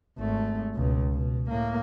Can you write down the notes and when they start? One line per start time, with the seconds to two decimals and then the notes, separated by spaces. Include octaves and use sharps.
0.18 G#1 A3
0.74 C#2 B2
1.11 B2
1.49 A2 A#3